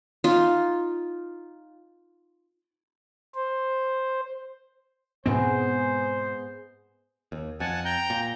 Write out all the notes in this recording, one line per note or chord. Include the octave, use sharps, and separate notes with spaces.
D#4 F4
C5
G#2 B2 G#3 B3 C4 G#4 C5
D#2
F2 F#5 G#5 A5
G5 A#5 G6
A#2